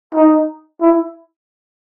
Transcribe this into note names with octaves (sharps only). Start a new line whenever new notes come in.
D#4
E4